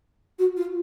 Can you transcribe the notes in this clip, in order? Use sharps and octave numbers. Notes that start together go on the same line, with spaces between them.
F#4
F4